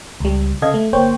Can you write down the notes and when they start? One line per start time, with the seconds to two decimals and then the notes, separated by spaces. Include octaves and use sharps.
0.20 C#2 G3
0.62 C#3 A4 D#5 F5 G#6
0.74 A3
0.93 G1 A#3 C5 C#5 G5